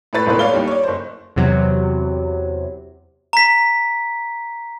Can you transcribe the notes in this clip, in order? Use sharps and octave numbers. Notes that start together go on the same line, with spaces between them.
A2 A3 B4 A6
D#1 G#1 A2 A3 B4
C#5 D5 F5 G7
D#2 G3
C#5 D5
F#1 C5
E2 C3 F#3
A#5 B6